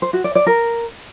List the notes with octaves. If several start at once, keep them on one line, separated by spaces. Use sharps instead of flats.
C5
F#4
D5
D5
A#4